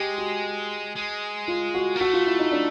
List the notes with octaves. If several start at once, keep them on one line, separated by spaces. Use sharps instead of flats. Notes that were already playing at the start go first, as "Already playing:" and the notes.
Already playing: G#3 G4
F#4
G#3
F4
F#4
A#3
A3 F#4
F4
E4
D#4
D4